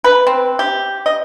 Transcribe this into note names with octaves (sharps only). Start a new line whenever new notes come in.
B4
C4
G4
D#5